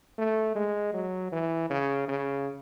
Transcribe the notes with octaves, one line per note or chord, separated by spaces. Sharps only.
A3
G#3
F#3
E3
C#3
C#3